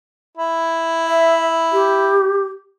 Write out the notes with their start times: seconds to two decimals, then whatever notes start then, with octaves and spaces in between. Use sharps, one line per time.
0.37 E4
1.07 E5
1.72 G4